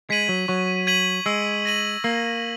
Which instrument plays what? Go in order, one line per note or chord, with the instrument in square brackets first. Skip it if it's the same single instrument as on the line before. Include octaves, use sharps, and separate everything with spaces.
[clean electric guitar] G#3 [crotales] G#6 B6 D#7 F#7
[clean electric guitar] F#3
[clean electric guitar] F#3 [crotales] C#6
[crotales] G#6 B6 D#7 F#7
[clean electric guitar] G#3 [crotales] E6
[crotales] A#6 D#7 F#7
[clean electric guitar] A#3 [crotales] E6